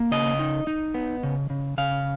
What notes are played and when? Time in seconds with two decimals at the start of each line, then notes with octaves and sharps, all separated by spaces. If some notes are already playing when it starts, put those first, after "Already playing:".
Already playing: A#3
0.11 C#3 D#5
0.39 D#4
0.67 D#4
0.94 B3
1.23 C#3
1.50 C#3
1.78 C#3 F5